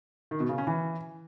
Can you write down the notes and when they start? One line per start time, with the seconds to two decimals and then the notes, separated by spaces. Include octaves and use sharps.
0.31 D#3
0.40 B2
0.49 C#3
0.58 C#4
0.67 E3